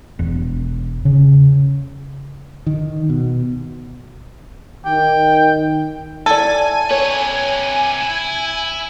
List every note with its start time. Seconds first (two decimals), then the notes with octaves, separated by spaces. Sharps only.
0.19 E1
1.05 C#3
2.66 D#3
3.10 B2
4.85 D#3 G5
6.26 E4 A4 D5 G#5
6.91 C3 B4 C#5
8.01 E4